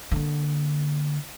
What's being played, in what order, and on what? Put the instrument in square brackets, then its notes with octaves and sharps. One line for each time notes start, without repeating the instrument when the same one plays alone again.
[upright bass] D3 A#3